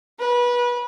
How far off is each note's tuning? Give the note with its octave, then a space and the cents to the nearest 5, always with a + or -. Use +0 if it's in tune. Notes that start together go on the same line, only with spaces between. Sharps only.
B4 -25